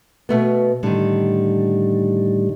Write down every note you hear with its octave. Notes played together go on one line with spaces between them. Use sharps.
B2 A3 B3
A2 D3 D#3 G3